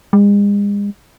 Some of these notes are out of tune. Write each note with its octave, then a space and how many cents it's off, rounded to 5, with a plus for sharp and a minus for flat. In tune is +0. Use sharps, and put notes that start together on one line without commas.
G#3 -40